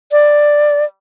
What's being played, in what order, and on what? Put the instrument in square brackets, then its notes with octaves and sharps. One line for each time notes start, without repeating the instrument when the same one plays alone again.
[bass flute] D5